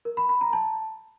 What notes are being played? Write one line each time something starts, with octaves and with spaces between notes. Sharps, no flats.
A#4
B5
B5
A#5
A5